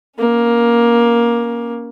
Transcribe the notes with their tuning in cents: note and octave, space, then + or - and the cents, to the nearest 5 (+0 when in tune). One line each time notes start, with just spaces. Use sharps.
A#3 +15 C#4 +0